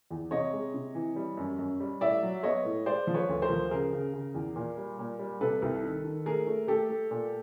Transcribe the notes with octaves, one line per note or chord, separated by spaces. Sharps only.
E2
C3 C#5 D#5
G#3
C3
E3
G3
F#2
F#2
G3
A2 D5 E5
F#3
B3 C#5 D#5
A2
G#3 C5 D5
F3
B4 C#5
D2
A#4 C5
F3
C#3 G#4 A#4
C#3
C#3
E2
A#2
G3
A#2
G3
C3 A4 B4
C2
D#3
D#3
A3 G#4 A#4
A3
A3 G4 A4
A3
A#2